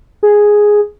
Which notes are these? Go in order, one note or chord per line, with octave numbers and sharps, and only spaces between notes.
G#4